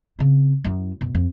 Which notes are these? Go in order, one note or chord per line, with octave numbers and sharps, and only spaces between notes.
C#3 C4
F#2 E4
F#2 B2
F2